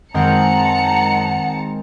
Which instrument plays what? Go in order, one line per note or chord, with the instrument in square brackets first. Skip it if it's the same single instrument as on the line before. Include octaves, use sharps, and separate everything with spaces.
[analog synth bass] F#2 [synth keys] D#3 G#3 C4 [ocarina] F#5 [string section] A5 A#5 C#7